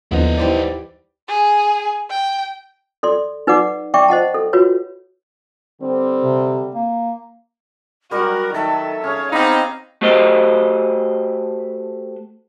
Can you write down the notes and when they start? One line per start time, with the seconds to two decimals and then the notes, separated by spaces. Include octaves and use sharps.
0.12 D#2 D3 F3 B3 E4 D#5
0.37 G#2 E3 G3 G4 C5 D5
1.28 G#4
2.10 G5
3.03 A4 D5 C6
3.47 D#4 B4 D5 F#5 D6
3.94 D5 E5 G5 C#6 D6
4.08 C5 D#5 F#5 A5
4.34 A4
4.53 F4 F#4 B4 C#5
5.81 D3 G3 C4
6.23 C3
6.75 A#3
8.11 F#3 G3 F#4 A#4
8.54 D#3 A4 E5
9.04 C#4 G#4 C#5 F5
9.32 B3 C4 D#4 G4 F5 B5
10.02 A3 F#4 G4 C5 D#5